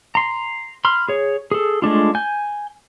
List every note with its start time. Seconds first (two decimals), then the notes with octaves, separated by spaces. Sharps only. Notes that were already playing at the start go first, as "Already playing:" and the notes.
0.15 A#5 C6
0.85 B5 C6 F6
1.09 G#4 C#5
1.51 G#4 A4
1.82 G#3 A3 D4 F4
2.15 G#5 G6